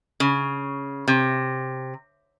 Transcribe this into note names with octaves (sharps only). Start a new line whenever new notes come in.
C#3
C3